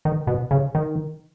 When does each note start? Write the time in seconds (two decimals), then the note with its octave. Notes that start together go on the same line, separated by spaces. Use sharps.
0.05 D#3
0.27 B2
0.51 C#3
0.75 D#3